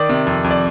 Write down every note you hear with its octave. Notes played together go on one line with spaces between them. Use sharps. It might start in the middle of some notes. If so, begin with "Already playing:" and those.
Already playing: D#3 D5
C3
F2
F2
D5